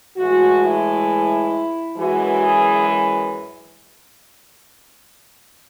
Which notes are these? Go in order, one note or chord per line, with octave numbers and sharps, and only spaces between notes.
A2 E3 G#3 F#4
E4
F#2 E3 G#3 F#4
G#4